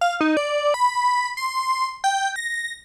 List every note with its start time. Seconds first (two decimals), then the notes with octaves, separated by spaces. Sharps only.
0.01 F5
0.20 D#4
0.37 D5
0.74 B5
1.37 C6
2.04 G5
2.36 A#6